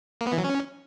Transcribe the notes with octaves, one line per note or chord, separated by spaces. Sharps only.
A#3
B3
E3
F#3
C#4